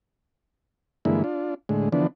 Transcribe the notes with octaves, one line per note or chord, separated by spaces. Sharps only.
G2 D3 E3 G#3 A#3 E4
D4 F4
A2 D3 G#3
D3 E3 F3 B3 D4